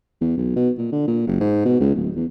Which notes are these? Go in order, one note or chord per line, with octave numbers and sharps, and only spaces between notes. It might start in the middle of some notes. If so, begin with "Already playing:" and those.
E2
B1
B2
A#2
D3
A#2
F#1
G#2
B2
C#2
D1
E2